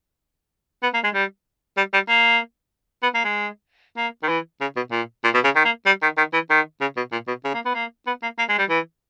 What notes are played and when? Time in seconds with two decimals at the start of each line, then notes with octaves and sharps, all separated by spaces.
0.83 B3
0.94 A#3
1.04 G#3
1.14 G3
1.77 G3
1.93 G3
2.09 A#3
3.03 B3
3.15 A#3
3.25 G#3
3.97 A#3
4.23 D#3
4.29 E3
4.61 C#3
4.76 B2
4.92 A#2
5.24 A#2
5.34 B2
5.44 C#3
5.56 D#3
5.65 A#3
5.86 G3
6.02 D#3
6.17 D#3
6.33 E3
6.50 D#3
6.81 C#3
6.97 B2
7.12 A#2
7.28 B2
7.45 C#3
7.54 A#3
7.66 B3
7.75 A#3
8.07 B3
8.22 A#3
8.38 A#3
8.49 G#3
8.59 G3
8.69 E3